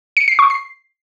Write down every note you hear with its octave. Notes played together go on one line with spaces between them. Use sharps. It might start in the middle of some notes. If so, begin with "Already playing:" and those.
C#7
C7
C#6
C7